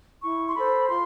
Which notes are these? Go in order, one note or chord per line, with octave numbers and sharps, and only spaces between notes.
E4 C#6
C6
A4 C5 B5
F4 C6